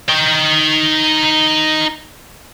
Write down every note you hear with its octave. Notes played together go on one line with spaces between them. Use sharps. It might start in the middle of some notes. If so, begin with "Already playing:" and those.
D#4 G5